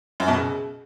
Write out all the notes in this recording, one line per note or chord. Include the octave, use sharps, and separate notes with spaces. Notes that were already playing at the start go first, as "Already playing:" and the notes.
F#2
B2
C#3